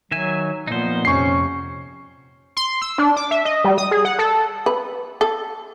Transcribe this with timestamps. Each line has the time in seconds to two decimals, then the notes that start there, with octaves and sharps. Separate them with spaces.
0.11 D#3 F#3 E5 G#5
0.67 A#2 F3 B3 D#4 C5
1.05 F2 C3 C#4 C#6 C7
2.57 C6
2.82 E6
2.98 D4
3.16 D6
3.31 E5
3.45 D#5
3.65 G3
3.78 D#6
3.91 G#4
4.05 F#5
4.19 A4
4.66 B4
5.21 A4